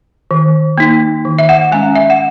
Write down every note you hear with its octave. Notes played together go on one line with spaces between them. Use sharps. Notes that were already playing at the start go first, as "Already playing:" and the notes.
D#3
A#3 D#4
D#3
E5
F#5
G#3 C#4 G#5
E5
F#5